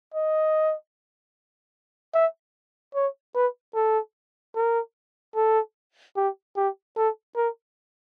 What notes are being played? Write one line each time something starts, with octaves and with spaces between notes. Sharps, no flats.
D#5
E5
C#5
B4
A4
A#4
A4
G4
G4
A4
A#4